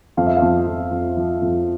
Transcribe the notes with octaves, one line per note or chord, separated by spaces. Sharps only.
F2 F5
E5
F2 F5
F2
F2
F3
F2